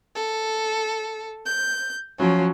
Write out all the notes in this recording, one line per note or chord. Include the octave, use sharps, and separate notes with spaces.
A4
G6
F3 F#3 C#4